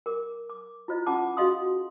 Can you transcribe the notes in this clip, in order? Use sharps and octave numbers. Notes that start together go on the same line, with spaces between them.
A#4 D6
D6
E4 F4 C5 D#5
C#4 F4 A4 F#5 A5 D6
F#4 G#4 D#5 F5 C6 D#6